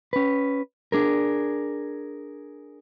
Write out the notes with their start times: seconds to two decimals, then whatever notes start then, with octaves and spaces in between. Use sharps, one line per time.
0.13 C#4 B4
0.92 D4 G#4 A#4